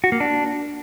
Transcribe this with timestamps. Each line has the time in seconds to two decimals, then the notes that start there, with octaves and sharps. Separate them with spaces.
0.04 F#4
0.12 A#3
0.20 D4